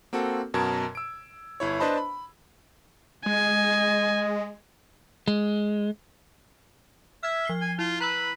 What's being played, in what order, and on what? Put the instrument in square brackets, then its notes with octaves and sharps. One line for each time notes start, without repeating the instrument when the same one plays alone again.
[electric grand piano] A#3 C4 F#4 A4
F#2 B2 A#4 A5 G#6
E6 D7
G1 E4 C#5
D4 B4 C5 D#5 A5 B5
B5
[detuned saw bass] G#3 [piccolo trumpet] D#5 [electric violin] G#5
[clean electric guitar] G#3
[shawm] E5 [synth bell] F6 G#6
[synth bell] F3 C7 G7
[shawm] G#5
[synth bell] E4 [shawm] F4
[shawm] B4 [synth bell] A#5 B5 E6